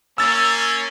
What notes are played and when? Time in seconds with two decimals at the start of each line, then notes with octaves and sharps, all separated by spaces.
0.18 A#3 C#4 E6 A6